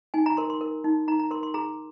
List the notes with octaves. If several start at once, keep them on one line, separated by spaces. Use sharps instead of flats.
D#4 G#5
A#5
A#4 C6
C6
A#4
D#4
D#4 A#5
A#5
A#4 C6
C6
G#4 A#5